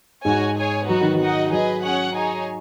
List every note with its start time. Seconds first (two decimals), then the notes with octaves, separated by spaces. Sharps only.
0.25 G#2 F#4 C#5 G#5
0.56 G#4 C#5 G#5
0.88 F#3 B3 D#4 F#4
1.01 D#3
1.14 F#3
1.20 D#4 F#4 D#5 F#5
1.51 F#3 G#4 B4 D#5
1.83 C#4 G#4 C#5 F#5
2.15 D#4 G#4 C#5 G#5